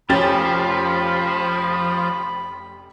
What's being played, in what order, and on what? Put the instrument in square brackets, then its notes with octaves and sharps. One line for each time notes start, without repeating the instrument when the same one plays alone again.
[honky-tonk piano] F1 G4 A6 [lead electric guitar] F3 [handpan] C#4 [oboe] B5